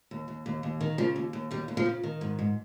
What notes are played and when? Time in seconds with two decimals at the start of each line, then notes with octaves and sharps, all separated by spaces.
0.11 D#2
0.28 D#2
0.46 D#2
0.63 D#2
0.81 D#3
0.98 C#3 F3
1.16 D#2
1.33 D#2
1.51 D#2 G3
1.68 D#2
1.77 F3
1.86 C#3
2.04 D#3
2.21 G#2
2.39 G#2